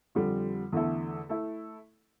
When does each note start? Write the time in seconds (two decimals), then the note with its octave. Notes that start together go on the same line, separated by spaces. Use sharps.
0.15 F2 D3 G3
0.72 E2 D3 A3 E4 A4
1.29 A3 E4 A4